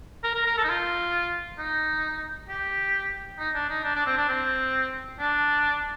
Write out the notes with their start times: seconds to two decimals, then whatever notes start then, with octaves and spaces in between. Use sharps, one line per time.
0.23 A#4
0.34 A#4
0.46 A#4
0.57 A4
0.64 D#4
0.69 F4
1.59 D#4
2.49 G4
3.39 D#4
3.54 D4
3.69 D#4
3.84 D4
3.95 D4
4.06 C4
4.18 D4
4.29 C4
5.19 D4